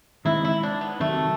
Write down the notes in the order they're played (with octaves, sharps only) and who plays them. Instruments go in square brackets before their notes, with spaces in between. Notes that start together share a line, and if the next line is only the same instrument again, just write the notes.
[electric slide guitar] D#3 G#3 C4 [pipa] E4
[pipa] E4
D4
B3
[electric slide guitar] C3 D#3 F#3 [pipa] A3